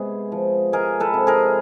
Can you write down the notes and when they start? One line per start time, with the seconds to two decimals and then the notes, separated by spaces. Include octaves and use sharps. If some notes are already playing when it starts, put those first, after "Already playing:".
Already playing: C3 G#3 B3 G#4
0.32 F3
0.72 G#3 G#4 A#4
1.00 A4 B4
1.14 C3
1.27 G#4 A#4